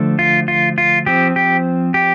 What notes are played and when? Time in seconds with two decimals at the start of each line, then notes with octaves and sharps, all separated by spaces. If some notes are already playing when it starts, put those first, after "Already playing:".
Already playing: D3 F3 A3
0.19 F4
0.48 F4
0.78 F4
1.06 F3 C4 G4
1.36 G4
1.94 G4